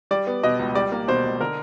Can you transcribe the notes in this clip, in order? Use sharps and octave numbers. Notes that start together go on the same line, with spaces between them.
G3 D5
B3
B2 D#5
C#2
G3 D5
A#3
B2 C5
C#2
D3 A#4